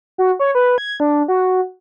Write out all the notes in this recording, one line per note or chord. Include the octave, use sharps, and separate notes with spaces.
F#4
C#5
B4
G#6
D4
F#4